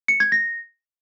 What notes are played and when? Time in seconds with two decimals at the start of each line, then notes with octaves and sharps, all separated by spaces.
0.08 C#7
0.20 G#6
0.32 A#6